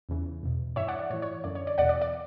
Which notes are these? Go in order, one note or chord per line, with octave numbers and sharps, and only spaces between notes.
E2 C#3 E3
E2 B2
G2 E3 C#5 E5
D5 F#5
D5
A2 E3 C#5
C#5
F#2 D3 D5
C#5
D5
E2 B2 D5 F#5
D5
D5